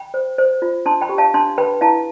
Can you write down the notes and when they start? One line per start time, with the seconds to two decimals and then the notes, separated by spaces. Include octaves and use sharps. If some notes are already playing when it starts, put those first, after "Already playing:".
Already playing: G5 B5
0.14 C5
0.38 C5
0.62 F4
0.86 D4 A5 C6
1.01 G5 B5
1.09 G4
1.18 F5 A5
1.34 D4 A5 C6
1.58 B4 G5 B5
1.81 E4 F5 A5